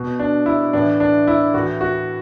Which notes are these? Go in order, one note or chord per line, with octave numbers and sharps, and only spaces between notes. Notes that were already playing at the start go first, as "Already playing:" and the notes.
Already playing: B2
D4
E4
A2 E3 D4
D4
E4
A2 E3 F#4
F#4